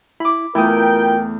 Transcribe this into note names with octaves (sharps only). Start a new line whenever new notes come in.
E4 B5 D6
E2 A3 E4 F4 A#4 G5 D#6